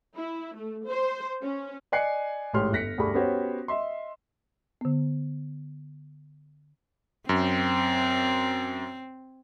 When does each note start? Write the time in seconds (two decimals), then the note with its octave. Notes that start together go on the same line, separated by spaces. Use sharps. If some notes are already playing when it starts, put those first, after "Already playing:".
0.16 E4
0.56 A3
0.87 C5
1.42 C#4
1.92 D5 D#5 G#5 F#6 C7 C#7
2.53 A1 G#2 G4 C#5 C6 F6
2.72 G1 F#6 A#6 B6 C#7
2.98 D2 G2 G3 G#4 B5 C#6
3.14 B3 C#4 F#4 G4 C5 C#5
3.68 D#5 E5 C6
4.81 D3 B3
7.29 F#2 C4